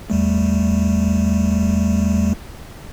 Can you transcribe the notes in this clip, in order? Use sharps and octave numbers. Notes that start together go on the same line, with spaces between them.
E2 G3 A3